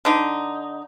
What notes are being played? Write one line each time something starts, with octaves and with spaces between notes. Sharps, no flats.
D3 D#4